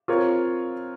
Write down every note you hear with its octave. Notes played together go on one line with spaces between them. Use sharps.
C4 F4 A#4 C#5